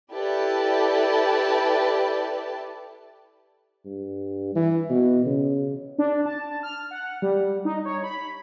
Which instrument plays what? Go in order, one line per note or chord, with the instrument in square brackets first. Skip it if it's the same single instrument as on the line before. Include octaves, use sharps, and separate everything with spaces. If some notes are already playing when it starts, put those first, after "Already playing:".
[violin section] E4 G4 A4 B4 D5 A5
[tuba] G2
E3
B2
C#3
[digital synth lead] D4
A5
F6
F#5
G3
D#4
C#5
B5